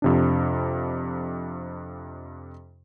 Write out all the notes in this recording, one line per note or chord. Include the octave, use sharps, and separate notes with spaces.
F2 C3 D4